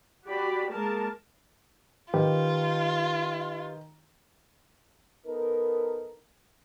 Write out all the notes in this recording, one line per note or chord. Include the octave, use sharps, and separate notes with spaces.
F#4 G4 D5 B5
G#3 A#3 A#4 A5
D#3 F4 G4 B4
B3 D#4 A4 A#4